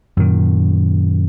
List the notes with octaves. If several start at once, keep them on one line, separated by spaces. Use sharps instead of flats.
F#2 A#2 D#3